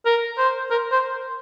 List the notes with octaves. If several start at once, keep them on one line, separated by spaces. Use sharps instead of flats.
A#4
C5
A#4
C5